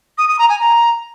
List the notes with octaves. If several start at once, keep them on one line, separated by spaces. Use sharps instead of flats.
D#6
D#6
A#5
G#5
A#5